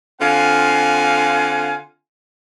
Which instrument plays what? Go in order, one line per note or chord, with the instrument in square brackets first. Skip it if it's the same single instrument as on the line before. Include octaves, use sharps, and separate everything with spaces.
[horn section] D3 C4 F4 F5 F#5 G#5